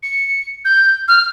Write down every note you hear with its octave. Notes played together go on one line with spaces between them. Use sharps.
C#7
G6
F6